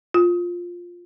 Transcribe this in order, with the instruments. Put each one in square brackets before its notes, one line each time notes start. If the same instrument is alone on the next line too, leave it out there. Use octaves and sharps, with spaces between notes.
[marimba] F4